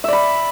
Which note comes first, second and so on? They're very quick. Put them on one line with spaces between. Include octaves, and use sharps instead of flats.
E5 D5 B5